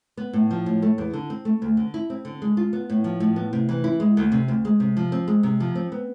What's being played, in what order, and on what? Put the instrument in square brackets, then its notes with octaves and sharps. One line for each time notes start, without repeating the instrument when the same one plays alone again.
[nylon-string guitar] B3
A2
F3
A2
A3
E2
D3
C4
A3
D2
D3
E4
C4
D3
G#3
F4
B3
A2
F3
A2
B3
C3
E3
E4
G#3
D2
C3
D2
G#3
C3
F3
C4
G#3
C3
F3
C4
B3